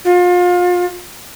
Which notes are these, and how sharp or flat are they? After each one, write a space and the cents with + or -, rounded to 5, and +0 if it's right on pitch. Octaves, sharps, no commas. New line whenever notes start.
F4 +35